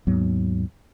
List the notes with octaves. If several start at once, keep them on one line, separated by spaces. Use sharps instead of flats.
D#2 G#2 F#3 B3